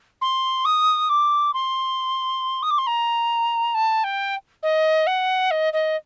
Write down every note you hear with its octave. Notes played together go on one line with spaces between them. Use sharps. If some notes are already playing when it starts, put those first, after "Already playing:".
C6
D#6
D6
C6
D#6
D6
C6
A#5
A5
G5
D#5
F#5
D#5
D#5